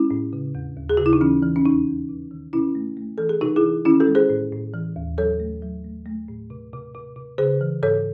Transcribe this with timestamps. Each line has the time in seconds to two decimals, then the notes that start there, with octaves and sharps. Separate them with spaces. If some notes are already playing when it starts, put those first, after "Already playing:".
Already playing: G#3 C#4 E4
0.11 A2
0.33 C#3
0.55 E2
0.77 D#2
0.90 G#4
0.97 C#3 F#4
1.06 E4
1.13 D#4
1.21 E3 C#4
1.42 E3
1.56 C#4
1.65 E2 D#4
1.87 E2
2.09 C3
2.31 D#3
2.53 C3 C#4 E4
2.75 A3
2.97 A3
3.18 E3 A4
3.29 G#4
3.41 C3 D#4 F#4
3.56 E4 G#4
3.64 E3
3.85 D#3 C#4 E4
4.00 F#4 A4
4.07 G#3
4.15 G#4 C5
4.30 A2
4.52 A2
4.74 E3
4.96 D#2
5.18 F#3 A4 C#5
5.40 A3
5.62 F#3
5.84 A3
6.06 A3
6.28 A2
6.50 C3
6.73 C3
6.94 C3
7.16 C3
7.38 C#3 G#4 C5
7.61 E3
7.82 G#2 A4 C#5